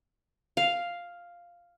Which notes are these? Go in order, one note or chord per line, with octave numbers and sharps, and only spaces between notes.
F5